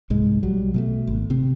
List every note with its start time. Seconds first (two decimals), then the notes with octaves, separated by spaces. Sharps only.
0.10 C2 G#2 G#3
0.43 B1 F#3 G3
0.74 B2 G#3 A3
1.07 G#1
1.30 C3 C4